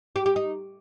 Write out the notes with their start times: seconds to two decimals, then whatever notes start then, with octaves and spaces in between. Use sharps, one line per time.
0.16 G4
0.26 G4
0.36 D#4